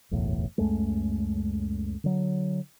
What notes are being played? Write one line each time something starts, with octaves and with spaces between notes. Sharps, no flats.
F#1 B1 E2 A2
C#2 F#2 G#3 A3
D3 F#3